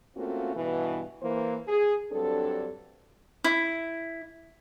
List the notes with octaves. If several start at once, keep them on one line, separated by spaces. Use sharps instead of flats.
A3 A#3 C4 C#4 F4 F#4
G2 B2 E3
E3 A#3 C5
G#4
G2 F#3 C4 D4 A4
E4